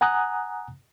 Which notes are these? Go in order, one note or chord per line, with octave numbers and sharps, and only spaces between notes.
F#5 G#5 A#5 D#6 F#6